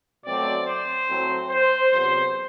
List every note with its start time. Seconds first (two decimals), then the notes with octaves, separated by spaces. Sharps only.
0.25 B2 F#3 A3 C4 D5
0.67 C5
1.08 A2 F#3 C4
1.49 C5
1.91 E2 C3 F#3 B3 C5